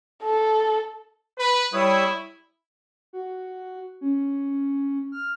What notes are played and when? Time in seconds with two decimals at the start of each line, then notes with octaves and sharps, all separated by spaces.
0.23 A4
1.39 B4
1.74 G3 E4 C#5 D#6
3.13 F#4
4.01 C#4
5.12 F6